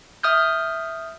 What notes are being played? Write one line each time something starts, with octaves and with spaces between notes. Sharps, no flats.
E5 D#6 F6 G6